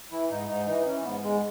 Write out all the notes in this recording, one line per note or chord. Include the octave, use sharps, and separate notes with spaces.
E3 E4
G#2 D#4
G#2 D#4
E3 D#4
E3 C#4
G#2 B3
G#2 G#3